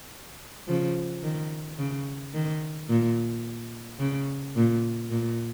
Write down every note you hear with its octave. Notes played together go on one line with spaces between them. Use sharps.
C#3 F3
D#3
C#3
D#3
A#2
C#3
A#2
A#2